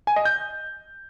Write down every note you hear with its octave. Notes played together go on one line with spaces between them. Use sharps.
G#5
D#5
G6